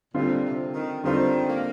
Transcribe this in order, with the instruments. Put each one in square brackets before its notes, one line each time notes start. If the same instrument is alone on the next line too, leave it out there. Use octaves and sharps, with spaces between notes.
[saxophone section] A#2 [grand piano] D3 G3 C4 F4 C5
[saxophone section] C3
D#3
[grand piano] D3 G3 C4 F4 C5 [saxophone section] D#3
[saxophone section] A#3